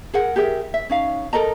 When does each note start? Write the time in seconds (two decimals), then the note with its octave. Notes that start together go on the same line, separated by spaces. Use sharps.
0.14 G#4 A#4 F#5
0.36 G4 G#4 A#4 E5
0.74 E5
0.90 C#4 D#4 F5
1.33 A4 A#4 D#5 A#5